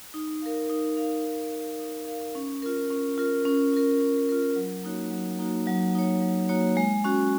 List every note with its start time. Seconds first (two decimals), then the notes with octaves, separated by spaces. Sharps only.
0.14 D#4
0.42 A#4 F5
0.70 D#4
0.97 A#4 F5
1.25 D#4
1.52 A#4 F5
1.79 D#4
2.07 A#4 F5
2.35 C#4
2.62 F4 A#4
2.90 C#4
3.18 F4 A#4
3.45 C#4
3.73 F4 A#4
4.00 C#4
4.29 F4 A#4
4.56 F#3
4.83 A#3 D#4 F#4 C#5
5.11 F#3
5.39 A#3 D#4 F#4 C#5
5.67 F#3
5.94 A#3 D#4 F#4 C#5
6.22 F#3
6.49 A#3 D#4 F#4 C#5
6.77 G#3
7.04 C#4 F#4